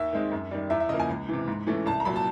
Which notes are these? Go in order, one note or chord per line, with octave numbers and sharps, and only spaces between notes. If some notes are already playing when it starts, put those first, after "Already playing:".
Already playing: D#2 E5
D#3 G#3 C4 D#4
F#2
D#3 G3
E2 E5
E5
C#3 F3 A#3 D#5
G#5
C#2
C3 E3
G#2
E3 A3 C#4
C2 A5
A#5
A#2 F#3 B5
A5